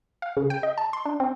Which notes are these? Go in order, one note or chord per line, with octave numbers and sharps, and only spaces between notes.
F5
C#3
G5
D#5
A5
C6
D4
C4